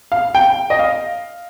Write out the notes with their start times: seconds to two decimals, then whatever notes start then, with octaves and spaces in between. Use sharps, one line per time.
0.12 F5
0.35 G5
0.70 D#5
0.79 F5